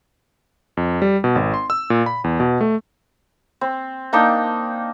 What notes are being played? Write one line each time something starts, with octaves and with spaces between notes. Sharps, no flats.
F2
G3
B2
G#1
C6
E6
A#2
B5
E2
B2
A3
C4
A#3 D4 D#4 G5